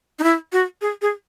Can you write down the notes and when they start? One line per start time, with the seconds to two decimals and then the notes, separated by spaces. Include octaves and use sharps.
0.19 D#4
0.23 E4
0.52 F#4
0.81 G#4
1.02 G#4